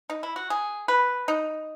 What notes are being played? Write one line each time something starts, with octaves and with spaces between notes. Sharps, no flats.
D#4
E4
F#4
G#4
B4
D#4